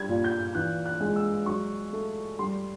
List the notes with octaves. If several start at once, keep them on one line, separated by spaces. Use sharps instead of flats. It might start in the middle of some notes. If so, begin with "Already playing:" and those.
Already playing: G3 G#6
A#2
G6
E3 F#6
F#6
G#3
E6
F#3 C#6
A3
G3 C6